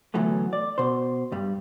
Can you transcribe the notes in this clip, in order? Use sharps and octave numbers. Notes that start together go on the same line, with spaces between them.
D2 A2 E3 F#3 A3 B3
D5
B2 C5
G2 G3